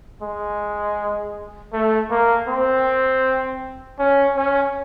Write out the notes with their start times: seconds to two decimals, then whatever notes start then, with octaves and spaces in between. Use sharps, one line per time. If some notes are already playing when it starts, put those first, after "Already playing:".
0.22 G#3
1.73 A3
2.11 A#3
2.48 C4
3.99 C#4
4.36 C#4